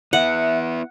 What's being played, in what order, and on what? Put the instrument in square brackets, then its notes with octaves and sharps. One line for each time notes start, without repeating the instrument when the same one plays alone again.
[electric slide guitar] B3 E4 [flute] E5 [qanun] F#5